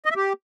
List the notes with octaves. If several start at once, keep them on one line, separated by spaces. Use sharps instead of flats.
D#5
E5
G4